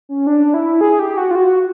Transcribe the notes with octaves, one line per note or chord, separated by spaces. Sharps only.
C#4
D4
E4
G#4
G4
F#4
F4
F#4